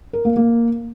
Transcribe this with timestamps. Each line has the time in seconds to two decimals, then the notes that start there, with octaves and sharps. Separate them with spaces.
0.13 A#4
0.25 A#3
0.37 A#3